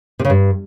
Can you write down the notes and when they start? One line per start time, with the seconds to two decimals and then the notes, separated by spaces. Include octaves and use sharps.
0.19 C3
0.25 C#3
0.30 G2